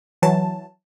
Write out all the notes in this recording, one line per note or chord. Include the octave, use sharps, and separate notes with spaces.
E3 F#3 A5